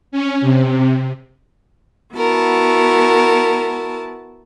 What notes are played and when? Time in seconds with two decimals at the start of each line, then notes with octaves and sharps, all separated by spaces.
0.12 C#4
0.41 C3
2.14 B3 E4 F#4 A#4 A5